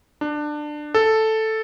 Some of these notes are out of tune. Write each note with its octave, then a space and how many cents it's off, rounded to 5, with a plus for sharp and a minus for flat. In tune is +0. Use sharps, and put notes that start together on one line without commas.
D4 +20
A4 +0